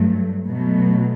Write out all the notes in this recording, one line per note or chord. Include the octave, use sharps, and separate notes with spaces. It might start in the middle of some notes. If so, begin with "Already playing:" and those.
Already playing: G2 F#3 A3
B2 F#3 A3